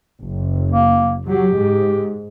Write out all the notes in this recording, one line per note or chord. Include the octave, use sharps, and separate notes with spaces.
F#1
A#3
F#3 G4
G#2